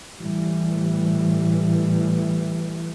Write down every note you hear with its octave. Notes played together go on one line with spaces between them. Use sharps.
A2 E3 G3